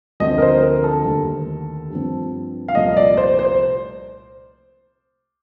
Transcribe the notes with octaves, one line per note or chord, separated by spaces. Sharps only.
D2 D3 F3 A3 C4 D#5
A#4
C5
A#4
A4
D#2 D3 A3
G2 F3 C4
F5
C2 A#2 F3 A3 D#5
D5
C5
C5